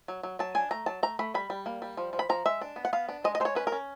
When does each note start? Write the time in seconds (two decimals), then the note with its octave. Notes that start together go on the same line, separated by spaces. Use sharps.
0.08 F#3
0.23 F#3
0.39 F#3 A5
0.55 D4 G#5
0.71 A3 A#5
0.86 F#3 A5
1.03 A3 A#5
1.19 A3 B5
1.34 G3 B5
1.50 G3
1.66 A#3
1.82 G3
1.97 F3
2.13 F3
2.19 B5
2.29 F3 A#5
2.45 G#3 E5
2.61 D4
2.76 B3
2.85 F#5
2.93 B3 F5
3.09 D4
3.24 G#3 D#5
3.35 D#5
3.40 G#3 C5
3.45 C#5
3.55 C#4 B4
3.67 A#4
3.72 C#4